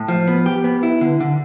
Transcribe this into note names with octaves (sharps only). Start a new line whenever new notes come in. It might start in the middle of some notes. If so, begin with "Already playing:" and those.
Already playing: A2
F3
B3
G4
B3
E4
D3
D3